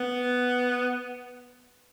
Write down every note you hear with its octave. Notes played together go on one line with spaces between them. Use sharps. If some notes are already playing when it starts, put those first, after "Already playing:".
Already playing: B3